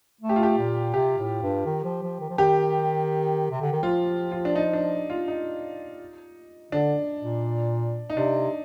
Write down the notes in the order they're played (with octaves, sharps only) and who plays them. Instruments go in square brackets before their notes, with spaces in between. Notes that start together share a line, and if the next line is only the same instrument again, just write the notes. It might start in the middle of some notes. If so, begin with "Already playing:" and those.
[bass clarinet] A3
[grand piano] G4
F4
G4
[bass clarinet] A#2
[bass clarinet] C3 [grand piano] G4
[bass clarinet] A2
G2
D#3
F3
F3
D#3
F3
[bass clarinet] D#3 [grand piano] G4
[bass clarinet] C3
D3
D#3
[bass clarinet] F3 [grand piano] F4
[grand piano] F4
D4
D#4
D4
F4
D#4
[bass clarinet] D3 [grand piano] D4
[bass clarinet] A#2
[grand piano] D#4
[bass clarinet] C3 [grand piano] D4